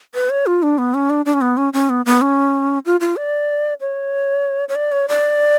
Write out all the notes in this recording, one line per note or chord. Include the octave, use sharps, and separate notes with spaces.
B4
C#5
F4
D4
B3
C#4
D4
D4
C#4
B3
C#4
C#4
B3
B3
C#4
F4
F4
D5
C#5
C#5
D5
C#5
D5